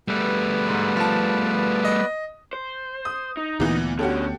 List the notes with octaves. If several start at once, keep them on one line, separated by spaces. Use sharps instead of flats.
G3 A3 B3 B4 D5
G#2
F3 A5
D#5
C5
D#6
D#4
D2 A#2 E3 A3 B3
D3 C#4 F#4 G4 A4